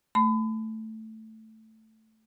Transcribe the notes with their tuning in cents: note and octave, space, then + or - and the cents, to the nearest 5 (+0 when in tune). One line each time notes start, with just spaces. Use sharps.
A3 +5 B5 +35